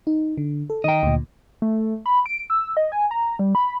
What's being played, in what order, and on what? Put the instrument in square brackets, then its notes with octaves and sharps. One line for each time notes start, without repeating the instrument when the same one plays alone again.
[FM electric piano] D#4
D3
A4
[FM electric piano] D#3 A#5 [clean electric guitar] D#5 G5
[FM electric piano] D2 A#2
[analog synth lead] A3
B5
D7
E6
D#5
G#5
A#5
G3
B5